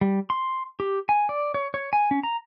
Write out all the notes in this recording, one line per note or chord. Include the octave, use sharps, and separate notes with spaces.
G3
C6
G4
G#5
D5
C#5
C#5
G#5
C#4
A#5